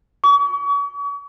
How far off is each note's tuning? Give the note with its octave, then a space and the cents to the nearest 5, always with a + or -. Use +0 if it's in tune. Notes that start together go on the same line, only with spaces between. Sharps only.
C#6 +40